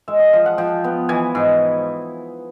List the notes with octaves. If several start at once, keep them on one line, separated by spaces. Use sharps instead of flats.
G#3 E5
D#5
F3 F5
F#5
F3 G5
B3
E3 G#5
G#2